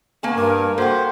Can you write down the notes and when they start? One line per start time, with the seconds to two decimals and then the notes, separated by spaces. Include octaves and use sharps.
0.23 A#3 B3 G#5 A5
0.35 G2 A#4 A#5 D6
0.78 A#3 F#4 A4 C5 G5